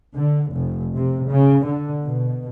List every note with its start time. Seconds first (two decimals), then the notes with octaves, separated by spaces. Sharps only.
0.15 D3
0.52 F1
0.96 C3
1.29 C#3
1.66 D3
2.04 B2